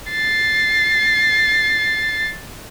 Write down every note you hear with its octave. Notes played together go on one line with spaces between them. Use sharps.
A6 C7